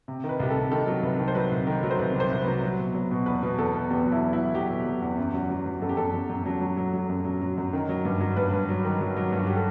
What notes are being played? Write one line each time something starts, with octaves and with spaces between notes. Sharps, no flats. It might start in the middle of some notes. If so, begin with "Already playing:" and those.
C3
D#3
B4
C2 G4
A4
C2
D#3 A4
F#3
C2 B4
D#3
C5
F#3 B4
C2
D#3
F#3
C5
C2 B4
C3 C5
C2
F#3 B4
F#3
B2
F#3
B2
E2 B4
B2
E2 A4
B2
E2 G4
F#3
E4
E2
E4
F#3
F#3 G4
B2
F#3
E2
F#2
F#3
F#3
F#3
F#2 A4
G4
F#2 A4
F#2
F#2
F#3
F#3
F#3
F#3
F#2
F#3
F#3
F#2
D#3
F#3
G2
F#3
G2 B4
G2
F#3
D#3
F#3
F#3
G2
F#4
G4
A4